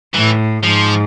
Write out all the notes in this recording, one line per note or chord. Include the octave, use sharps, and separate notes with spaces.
A2 E3
G#2 F3